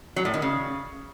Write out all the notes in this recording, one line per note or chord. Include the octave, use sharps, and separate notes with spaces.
F#3
A2
D#3
C#3